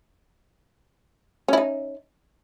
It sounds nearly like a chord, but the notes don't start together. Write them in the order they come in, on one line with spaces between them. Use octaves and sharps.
C#4 E4 D#4